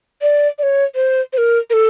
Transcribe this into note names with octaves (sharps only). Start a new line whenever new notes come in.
D5
D5
C#5
C5
C5
A#4
A#4
A4